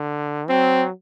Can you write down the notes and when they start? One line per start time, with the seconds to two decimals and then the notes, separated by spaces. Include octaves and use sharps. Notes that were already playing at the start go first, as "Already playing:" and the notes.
Already playing: D3
0.49 F#3 C4